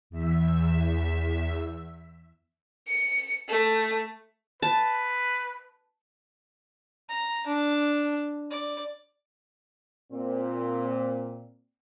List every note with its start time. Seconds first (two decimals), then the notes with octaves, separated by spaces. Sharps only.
0.10 E2 E5
2.88 C#7
3.49 A3
4.62 B4 A5
7.09 A#5
7.47 D4
8.50 D5
10.12 A#2 C4